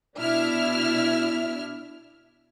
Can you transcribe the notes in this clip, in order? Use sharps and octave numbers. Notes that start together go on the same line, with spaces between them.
B2 D4 E4 E5 F6